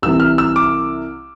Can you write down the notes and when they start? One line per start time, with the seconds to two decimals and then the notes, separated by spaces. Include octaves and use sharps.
0.02 C2 C3 E3 E6
0.20 F6
0.38 E6
0.56 D6